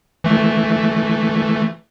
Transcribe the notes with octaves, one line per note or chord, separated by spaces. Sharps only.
E3 A3